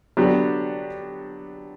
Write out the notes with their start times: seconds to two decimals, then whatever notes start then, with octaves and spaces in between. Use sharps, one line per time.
0.17 D3 F#3 B3 D4 G4